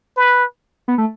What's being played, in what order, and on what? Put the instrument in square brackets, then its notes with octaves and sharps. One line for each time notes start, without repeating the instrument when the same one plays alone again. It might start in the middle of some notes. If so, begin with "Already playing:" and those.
[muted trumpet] B4
[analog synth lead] B3
A3